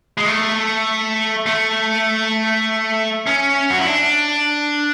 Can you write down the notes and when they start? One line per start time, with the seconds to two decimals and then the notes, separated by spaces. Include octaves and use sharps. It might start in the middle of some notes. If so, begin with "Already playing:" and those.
0.18 G#3
0.26 A3
1.46 A3
3.27 C#4
3.70 F#4
3.78 E4
3.87 D4